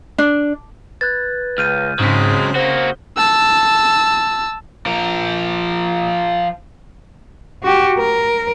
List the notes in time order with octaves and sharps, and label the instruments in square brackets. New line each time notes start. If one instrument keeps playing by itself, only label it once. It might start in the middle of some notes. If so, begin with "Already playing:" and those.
[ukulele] D4
[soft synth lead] B4 [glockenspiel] F#6 G#6 A6
[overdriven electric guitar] C#2 [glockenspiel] F6 G6 D#7
[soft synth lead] G#2 [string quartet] C#3 C4 [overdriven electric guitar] F#3 G#3 [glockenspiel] D#6 B6
[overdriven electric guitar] A#3 F#4 [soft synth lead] C5 [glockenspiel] G7
[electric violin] A5 E6
[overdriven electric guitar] F3 A#4
[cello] F#4 G4
A#4